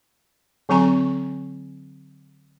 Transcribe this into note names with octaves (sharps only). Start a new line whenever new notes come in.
D3 F#3 C4 G#5 A#5 C#6